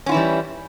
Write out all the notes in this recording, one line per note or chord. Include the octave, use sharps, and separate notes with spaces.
E3 G3 C#4 E4 F4